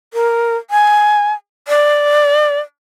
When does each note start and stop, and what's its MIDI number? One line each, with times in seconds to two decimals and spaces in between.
0.14 0.57 70
0.70 1.33 80
1.68 2.59 74